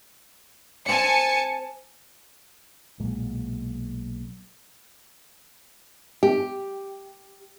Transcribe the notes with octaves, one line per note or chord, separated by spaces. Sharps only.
C4 D5 G#5 A5 C#7
B1 A#2 G#3
G4